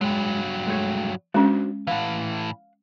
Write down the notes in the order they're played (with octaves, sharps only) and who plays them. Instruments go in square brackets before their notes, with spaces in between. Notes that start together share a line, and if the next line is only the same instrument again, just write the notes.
[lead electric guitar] G2 F#3 [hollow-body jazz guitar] G#3
[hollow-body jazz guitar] G#3 A3 C#5
[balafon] G#3 C#4 [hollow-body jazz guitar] D4 F#4 C5
[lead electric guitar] A2 E3 [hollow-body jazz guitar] F5 F#5